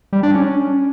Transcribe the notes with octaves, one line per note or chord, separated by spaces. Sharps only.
G3
D4
C#4